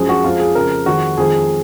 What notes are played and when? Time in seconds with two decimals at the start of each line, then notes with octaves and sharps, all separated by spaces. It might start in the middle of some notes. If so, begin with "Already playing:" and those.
Already playing: F#2 F3 G#3 G#4
0.09 F#4
0.24 F2 F3 G#3 F4
0.39 G#4
0.55 F2 C#3 G#3 A#4
0.86 F2 D#3 G#3 F#4
1.17 F2 D#3 G#3 G#4